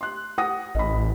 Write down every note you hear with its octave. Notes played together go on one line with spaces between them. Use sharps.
C6 F#6
F#5 D#6 A#6
A1 D#5 B5